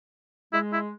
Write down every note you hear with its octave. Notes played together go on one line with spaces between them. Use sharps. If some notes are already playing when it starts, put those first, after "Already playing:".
G#3 E4
E4